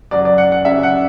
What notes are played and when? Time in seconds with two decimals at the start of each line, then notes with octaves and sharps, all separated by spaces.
0.11 F#2 C#3 F#3 D5
0.25 D5
0.38 F#5
0.52 F#5
0.65 F#2 C#3 F#3 E5
0.83 F#5